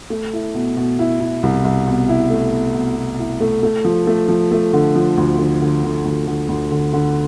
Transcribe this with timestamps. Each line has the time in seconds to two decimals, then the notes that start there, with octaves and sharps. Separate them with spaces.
0.10 A3
0.33 E4
0.54 B2
0.77 B2
0.99 E4
1.20 E4
1.43 C2
1.64 C2
1.87 B2
2.08 E4
2.30 A3
2.52 B2
2.75 B2
2.96 B2
3.19 E4
3.40 A3
3.63 A3
3.84 F3
4.07 A3
4.28 F3
4.51 A3
4.73 D3
4.95 F3
5.17 D2
5.38 D3
5.61 D3
5.83 D3
6.05 D2
6.27 D3
6.48 D2
6.71 D3
6.93 D3